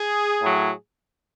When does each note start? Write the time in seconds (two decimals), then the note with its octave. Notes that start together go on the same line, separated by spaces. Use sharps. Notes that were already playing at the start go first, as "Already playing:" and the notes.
Already playing: G#4
0.41 A2 F#3